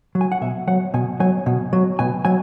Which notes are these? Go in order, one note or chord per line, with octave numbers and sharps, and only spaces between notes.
F#3
G#5
F#5
B2 E5
F#3 F#5
B2 G#5
F#3 G#5
B2
F#3
B2 G#5
F#3 G#5